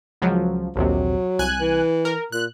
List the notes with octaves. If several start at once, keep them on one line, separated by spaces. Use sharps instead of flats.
C#2 F3 F#3
A#1 D#2 C3 F#3
C2 G#5 F#6
E3
A#4
A#2 F#6